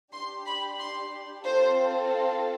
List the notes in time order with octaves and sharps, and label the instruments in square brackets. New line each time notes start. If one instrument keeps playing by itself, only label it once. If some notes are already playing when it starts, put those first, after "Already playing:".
[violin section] D4 G4 C6
B5
C6
C4 F4 A4 C5